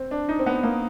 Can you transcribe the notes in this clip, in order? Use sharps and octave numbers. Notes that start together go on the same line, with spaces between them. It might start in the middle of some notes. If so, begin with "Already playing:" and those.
Already playing: C4
D4
D#4
C4
B3
A#3